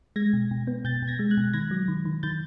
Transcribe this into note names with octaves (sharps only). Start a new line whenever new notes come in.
G#3 G#6 A#6
B2
B2
B3
B2 G6 A6
B2
G#6 A#6
G#3
F#6 G#6
B2
D#3 G#6 A#6
F#3
D#3
D#3
D#3 G6 A6